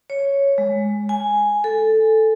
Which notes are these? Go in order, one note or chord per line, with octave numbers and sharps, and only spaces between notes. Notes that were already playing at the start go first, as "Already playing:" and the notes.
C#5
G#3
G#5
A4